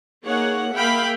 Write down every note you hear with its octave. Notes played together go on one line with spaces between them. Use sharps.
A#3 D#4 G#4 C#5 F#5
A#3 G#4 E5 F5 G5 B5